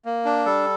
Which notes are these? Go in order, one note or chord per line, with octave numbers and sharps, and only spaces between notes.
A#3
D4
G3 A4